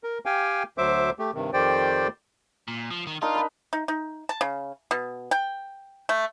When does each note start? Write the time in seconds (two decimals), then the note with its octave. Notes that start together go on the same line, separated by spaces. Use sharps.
0.04 A#4
0.26 G4 F5 G5 G#5
0.78 D2 F#3 C5 E5 D6
1.19 A3 G4
1.34 G2 C3 D#3
1.53 F2 D#3 G4 C5 D5 G5
2.68 A#2
2.91 F3
3.07 D#3
3.22 D4 D#4 F4 A#4
3.35 B4 B5
3.73 D#4
3.88 D#4
4.29 A5
4.41 C#3
4.91 B2
5.31 G5
6.09 A3